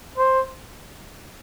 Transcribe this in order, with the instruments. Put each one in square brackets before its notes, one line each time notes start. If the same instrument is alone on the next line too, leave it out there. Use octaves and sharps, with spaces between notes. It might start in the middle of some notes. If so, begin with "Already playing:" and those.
[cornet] C5